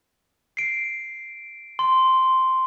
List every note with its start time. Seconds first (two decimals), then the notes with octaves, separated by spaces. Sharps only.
0.57 C7 D7
1.79 C6